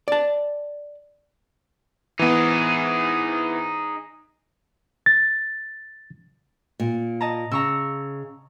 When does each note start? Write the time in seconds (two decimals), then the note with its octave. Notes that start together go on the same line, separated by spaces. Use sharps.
0.08 D5 A5
2.19 E3 B3 D#4 G#4
5.06 A6
6.80 A#2
7.21 D#5 A5 A#5
7.52 C#3 A#5 C#6 E6